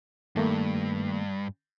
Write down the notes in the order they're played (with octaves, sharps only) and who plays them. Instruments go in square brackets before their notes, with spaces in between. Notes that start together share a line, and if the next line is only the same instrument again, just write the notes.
[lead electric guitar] G2 [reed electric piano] D#3 A3 A#3